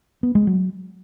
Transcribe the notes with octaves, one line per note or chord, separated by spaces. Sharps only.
B3
G#3
F#3